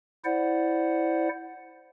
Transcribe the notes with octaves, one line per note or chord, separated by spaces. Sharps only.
E4 C5 D5 F#5